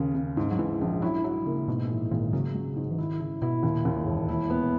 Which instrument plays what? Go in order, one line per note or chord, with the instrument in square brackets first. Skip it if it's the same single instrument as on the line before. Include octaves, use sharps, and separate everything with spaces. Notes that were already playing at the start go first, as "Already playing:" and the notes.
Already playing: [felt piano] D#2 C#3
C#3
G#2
[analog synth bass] F#3
[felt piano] G#2 [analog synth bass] E3
[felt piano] A#1
[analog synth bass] F#3 [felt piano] E4
[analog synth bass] F#3 [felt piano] E4
[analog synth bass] C#3 [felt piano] A#3
[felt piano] G#2 [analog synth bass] B2
[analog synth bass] A#2 [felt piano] E3
[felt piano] G#1 [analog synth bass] A#2
[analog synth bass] C#3 [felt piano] F#3
[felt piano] F#3
G#2
[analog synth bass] E3
[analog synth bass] D#3 [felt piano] E4
[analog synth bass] C#3 [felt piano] E4
[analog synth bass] B2 [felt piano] E4
[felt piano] D#2 [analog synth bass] A#2
[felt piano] D#2
[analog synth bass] A#2
G#2
[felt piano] E1 [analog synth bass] F#2
[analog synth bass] G#2
[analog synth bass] A#2 [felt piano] E4
[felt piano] B3